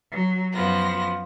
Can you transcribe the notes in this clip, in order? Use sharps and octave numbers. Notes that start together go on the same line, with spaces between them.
F#3
F#2 F3 B3 A#6